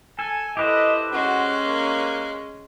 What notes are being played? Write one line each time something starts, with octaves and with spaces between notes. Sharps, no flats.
A4 G#5
E4 G4 A4 B4 C5 D#5
G#3 C#4 F#4
A#3